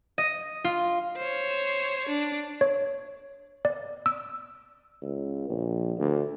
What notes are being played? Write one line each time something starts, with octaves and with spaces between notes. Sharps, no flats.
D#5
F4
C5 C#5
D4
C#5
D5
E6
C#2
A#1
D2